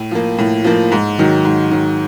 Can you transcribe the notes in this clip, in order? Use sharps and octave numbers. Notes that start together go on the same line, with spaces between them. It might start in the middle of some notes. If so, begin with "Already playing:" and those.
Already playing: A2
F3 A#3
A2
F3 A#3
G#2
D#3 F#3
G#2
D#3 F#3